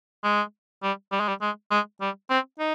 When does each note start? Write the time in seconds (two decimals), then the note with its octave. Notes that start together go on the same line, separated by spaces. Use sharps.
0.24 G#3
0.83 G3
1.12 G3
1.20 G#3
1.28 G3
1.41 G#3
1.71 G#3
2.01 G3
2.30 C4
2.59 D#4